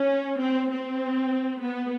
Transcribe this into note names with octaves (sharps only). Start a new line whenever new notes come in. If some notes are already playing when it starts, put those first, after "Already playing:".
Already playing: C#4
C4
C4
B3